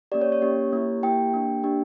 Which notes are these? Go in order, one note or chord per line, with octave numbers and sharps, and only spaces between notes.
A#3 C#4 G4 D5
C#5
C#5
A#3 C#4 G4
A#3 E4 G4
A#3 E4 G4 G5
A#3 D4 G4
A#3 D4 G4